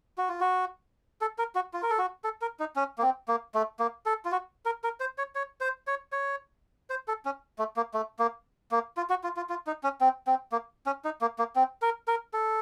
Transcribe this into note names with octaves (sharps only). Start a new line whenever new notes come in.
F#4
F4
F#4
A4
A#4
F#4
F4
A#4
A4
F#4
A4
A#4
D#4
C#4
A#3
C4
A#3
A3
A#3
A4
F4
F#4
A#4
A#4
C5
C#5
C#5
C5
C#5
C#5
C5
A4
C#4
A3
A#3
A3
A#3
A#3
F4
F#4
F4
F4
F4
D#4
C#4
C4
C4
A#3
C#4
D#4
A#3
A#3
C4
A#4
A#4
A4